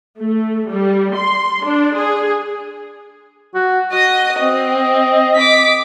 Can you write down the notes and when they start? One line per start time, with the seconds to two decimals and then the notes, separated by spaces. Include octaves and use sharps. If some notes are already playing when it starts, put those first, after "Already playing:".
0.19 A3
0.69 G3
1.14 C6
1.64 D4
1.96 G#4
3.55 F#4
3.92 F#4 D#5 D#6
4.40 C4 D#5
5.36 D6 B6